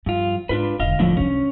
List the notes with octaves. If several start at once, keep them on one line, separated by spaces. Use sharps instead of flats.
G2 F3 F4
G#2 D4 F4 B4
E1 D3 D#5 F5
E1 C2 A2 D3 F3
C2 C#4 D4